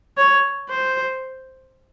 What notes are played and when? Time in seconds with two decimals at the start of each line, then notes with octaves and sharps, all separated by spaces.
0.17 C#5
0.69 C5